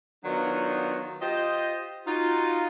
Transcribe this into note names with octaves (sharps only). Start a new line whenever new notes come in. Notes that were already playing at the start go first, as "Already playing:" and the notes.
D#3 F#3 B3 D4 D#4 F4
F4 G4 C5 D#5
D#4 F4 F#4